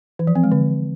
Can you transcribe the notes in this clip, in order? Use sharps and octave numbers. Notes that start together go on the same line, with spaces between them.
E3
F3
C4
G#3
D3